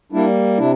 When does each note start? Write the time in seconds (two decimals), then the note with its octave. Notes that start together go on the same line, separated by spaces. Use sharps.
0.12 G3 A#3 D4 E4
0.58 C3 D4 E4